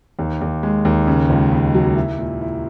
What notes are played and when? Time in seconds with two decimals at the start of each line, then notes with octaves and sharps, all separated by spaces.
0.19 D#2
0.41 D#2
0.63 G#3
0.85 D#2
1.07 C#3
1.30 C#2
1.52 C#3
1.75 F#3
1.96 E4
2.18 A#2
2.41 E4